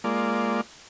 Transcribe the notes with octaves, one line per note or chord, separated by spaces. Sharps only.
G#3 A#3 F4 D5